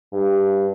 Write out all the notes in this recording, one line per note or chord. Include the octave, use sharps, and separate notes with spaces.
G2